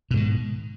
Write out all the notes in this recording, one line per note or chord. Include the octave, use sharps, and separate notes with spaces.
G#2 B2 D#3